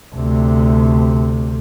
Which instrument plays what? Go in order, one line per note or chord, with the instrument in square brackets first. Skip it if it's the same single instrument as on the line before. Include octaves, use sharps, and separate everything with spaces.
[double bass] D2 C3